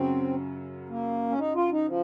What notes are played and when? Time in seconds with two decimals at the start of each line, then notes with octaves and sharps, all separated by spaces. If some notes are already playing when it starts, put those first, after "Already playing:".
Already playing: F#2 C#3 F#3 C4
0.89 A#3
1.30 C#4
1.39 D#4
1.55 F4
1.72 D#4
1.88 F3